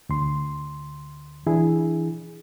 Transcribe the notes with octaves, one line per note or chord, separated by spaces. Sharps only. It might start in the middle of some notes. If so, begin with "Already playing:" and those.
D2 C6
E3 D4 E4 G#4